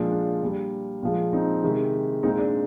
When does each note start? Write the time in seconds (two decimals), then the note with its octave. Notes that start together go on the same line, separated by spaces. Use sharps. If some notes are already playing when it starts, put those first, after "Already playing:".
Already playing: A#2 F3 G#3 D4
0.12 D4
0.42 A#2 G3
1.03 A#2 F3 G#3
1.33 C4 D#4
1.63 C3 D#3 G#3
2.23 A#2 G#3 C4 D#4
2.39 D4